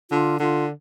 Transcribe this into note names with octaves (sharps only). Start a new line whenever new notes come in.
D3 F4
D3 F4